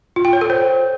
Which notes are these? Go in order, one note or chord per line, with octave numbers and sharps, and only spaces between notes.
F4
G5
C#5
A4
C5